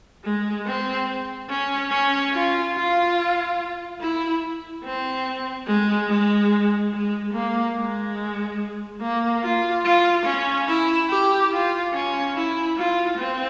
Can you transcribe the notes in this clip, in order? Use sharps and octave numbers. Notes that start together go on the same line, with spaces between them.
G#3
C4
C#4
C#4
F4
F4
E4
C4
G#3
G#3
G#3
A#3
G#3
A#3
F4
F4
C#4
E4
G4
F4
C#4
E4
F4
C4